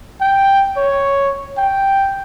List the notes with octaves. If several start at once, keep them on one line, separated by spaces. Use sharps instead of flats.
G5
C#5
G5